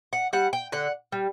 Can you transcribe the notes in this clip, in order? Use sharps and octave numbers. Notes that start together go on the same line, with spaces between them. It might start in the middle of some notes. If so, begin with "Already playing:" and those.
F#5
G3 F#5
G5
D3 F#5
G3